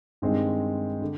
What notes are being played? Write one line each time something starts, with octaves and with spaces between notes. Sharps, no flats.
G2 D#3 G#3 C4
D3